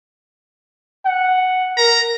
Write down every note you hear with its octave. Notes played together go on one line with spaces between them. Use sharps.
F#5
A#4 A#5